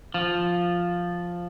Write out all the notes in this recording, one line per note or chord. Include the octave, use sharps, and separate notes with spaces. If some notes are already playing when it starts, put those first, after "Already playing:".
F3